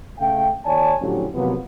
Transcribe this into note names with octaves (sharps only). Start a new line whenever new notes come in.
C#3 A3 F5 G5
D#2 C#5 D5 G#5 A5
A2 D3 F3 F#3 C#4 G4
C3 D#3 F3 F#3 A#3 B3